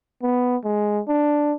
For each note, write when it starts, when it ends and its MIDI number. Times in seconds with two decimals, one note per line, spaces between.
0.23 0.57 59
0.65 1.01 56
1.08 1.54 62